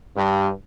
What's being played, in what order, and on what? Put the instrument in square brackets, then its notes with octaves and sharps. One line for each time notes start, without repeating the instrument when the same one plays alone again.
[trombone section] G2